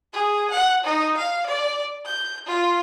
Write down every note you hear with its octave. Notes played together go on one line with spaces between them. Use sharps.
G#4
F#5
D#4
F5
D5
G6
F4